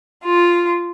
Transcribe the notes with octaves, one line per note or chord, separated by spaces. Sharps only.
F4